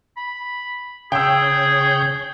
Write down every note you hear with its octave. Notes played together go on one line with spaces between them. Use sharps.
B5
C#3 G#4 C#5 G5 E6 G6